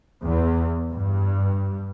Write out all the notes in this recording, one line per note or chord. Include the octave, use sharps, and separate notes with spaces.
E2
G2